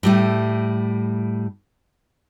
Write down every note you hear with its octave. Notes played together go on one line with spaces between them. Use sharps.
A2 G3 A3